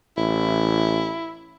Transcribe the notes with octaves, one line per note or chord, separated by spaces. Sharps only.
A1 E4